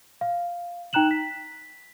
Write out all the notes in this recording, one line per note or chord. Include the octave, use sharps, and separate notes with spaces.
F5
D#4 G5 A#5 F#6 E7 F#7
B6